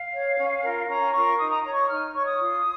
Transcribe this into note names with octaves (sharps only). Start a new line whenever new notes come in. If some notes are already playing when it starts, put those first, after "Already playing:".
Already playing: F5
C#5
C#4
F4 A#4
C#4 A#5
F4 A#4 C#6
D#4 D#6
A#5
C#5 A#5
C#6
D#4 F6
C#5 C#6
D#6
F4